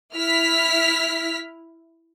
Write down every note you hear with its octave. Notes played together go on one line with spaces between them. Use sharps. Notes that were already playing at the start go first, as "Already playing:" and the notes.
E4 F6 B6